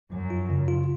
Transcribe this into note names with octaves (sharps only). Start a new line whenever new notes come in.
F#2 F3
F4
C#3
F4